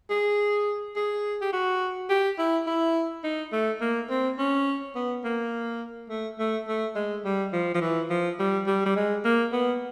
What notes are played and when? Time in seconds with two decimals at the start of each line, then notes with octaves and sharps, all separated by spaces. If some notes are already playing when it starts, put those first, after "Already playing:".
0.10 G#4
0.96 G#4
1.41 G4
1.53 F#4
2.09 G4
2.38 E4
2.67 E4
3.24 D#4
3.52 A3
3.81 A#3
4.10 C4
4.38 C#4
4.95 B3
5.24 A#3
6.09 A3
6.39 A3
6.68 A3
6.95 G#3
7.25 G3
7.53 F3
7.74 F3
7.81 E3
8.10 F3
8.39 G3
8.67 G3
8.86 G3
8.96 G#3
9.25 A#3
9.52 B3